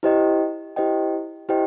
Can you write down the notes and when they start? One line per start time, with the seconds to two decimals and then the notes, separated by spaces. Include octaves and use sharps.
0.03 E4 G4 C5 D#5 G5
0.76 E4 G4 C5 D#5 G5
1.49 E4 G4 C5 D#5 G5